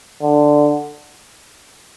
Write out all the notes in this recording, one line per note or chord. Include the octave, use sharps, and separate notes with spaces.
D3